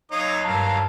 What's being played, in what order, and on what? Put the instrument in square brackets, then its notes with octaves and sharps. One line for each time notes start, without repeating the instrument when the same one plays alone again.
[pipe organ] D#2 F#3 F5 [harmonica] D#4 C#5 D#6
[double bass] G2 [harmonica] A#4 [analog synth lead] A5